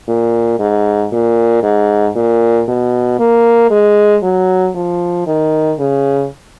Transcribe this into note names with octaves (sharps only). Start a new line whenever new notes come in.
A#2
G#2
A#2
G#2
A#2
B2
A#3
G#3
F#3
F3
D#3
C#3